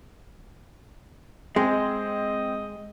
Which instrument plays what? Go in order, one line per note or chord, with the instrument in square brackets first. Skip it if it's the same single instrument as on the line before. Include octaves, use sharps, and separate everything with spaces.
[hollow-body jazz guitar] G#3 [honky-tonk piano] C4 [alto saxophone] D#5